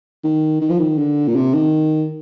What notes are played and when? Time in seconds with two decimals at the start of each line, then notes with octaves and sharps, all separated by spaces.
0.24 D#3
0.61 D#3
0.70 F3
0.79 D#3
0.98 D3
1.28 A#2
1.36 C3
1.54 D#3